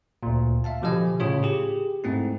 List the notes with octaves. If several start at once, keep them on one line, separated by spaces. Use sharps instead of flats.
D2 A#2
E5 F5 A5
B2 D3 F3 G4 D#5 G#5
A2 C#3 F4 C#5
G4 G#4
G#2 A3 C4 E4